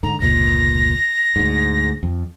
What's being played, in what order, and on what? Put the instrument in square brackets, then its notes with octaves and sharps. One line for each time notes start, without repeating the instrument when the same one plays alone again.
[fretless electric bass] G#2 D3 [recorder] A#5
[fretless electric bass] F1 C#2 A#2 [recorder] A#6
[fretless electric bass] D2 G#2
F2